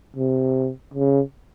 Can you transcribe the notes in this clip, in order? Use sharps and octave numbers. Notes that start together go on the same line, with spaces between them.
C3
C#3